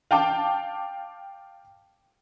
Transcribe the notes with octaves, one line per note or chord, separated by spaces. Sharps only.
F5 G5 A5 D6